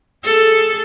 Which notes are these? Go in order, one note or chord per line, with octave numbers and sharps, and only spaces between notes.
G#4 A4